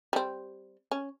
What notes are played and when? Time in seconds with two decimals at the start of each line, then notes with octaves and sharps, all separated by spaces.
0.13 G3 C4
0.91 C#4